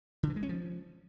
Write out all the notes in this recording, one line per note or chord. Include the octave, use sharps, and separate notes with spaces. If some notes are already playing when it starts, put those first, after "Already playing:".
D3
E3
G#3
C#4
F3